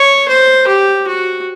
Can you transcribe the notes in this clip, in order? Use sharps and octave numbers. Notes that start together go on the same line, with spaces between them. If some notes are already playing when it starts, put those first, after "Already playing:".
Already playing: C#5
C5
G4
F#4